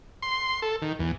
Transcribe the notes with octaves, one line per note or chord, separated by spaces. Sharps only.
C6
A4
D#3
E2